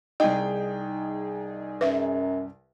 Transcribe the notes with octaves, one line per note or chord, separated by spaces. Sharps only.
C2 D#4 G#4 D#5 G5
F#2 B4 E5